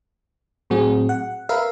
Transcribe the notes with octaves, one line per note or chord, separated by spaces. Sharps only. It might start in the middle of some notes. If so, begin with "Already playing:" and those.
A2 F#3 C4 F#4 G#4
F#5
A#4 B4 E5 F5